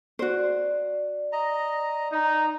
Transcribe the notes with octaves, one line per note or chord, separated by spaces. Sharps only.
F#4 C5 D5
D#5 A#5
D#4 A#5